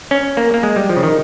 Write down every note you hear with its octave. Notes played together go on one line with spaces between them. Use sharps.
C#4
A#3
A#3
G#3
G3
F3
C#3
D#3